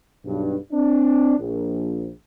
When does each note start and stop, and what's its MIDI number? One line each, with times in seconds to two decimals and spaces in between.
0.25 0.56 35
0.25 0.56 43
0.72 1.36 60
0.72 1.36 62
1.38 2.09 34